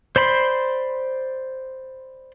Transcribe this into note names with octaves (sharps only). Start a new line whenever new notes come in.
C5 D5 B5 C6